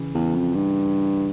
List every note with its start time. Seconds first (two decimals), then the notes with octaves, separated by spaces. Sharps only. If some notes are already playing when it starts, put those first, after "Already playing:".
Already playing: C#3 E3
0.14 E2
0.35 F2
0.55 G2